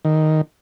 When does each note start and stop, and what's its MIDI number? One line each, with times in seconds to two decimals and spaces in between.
0.05 0.41 51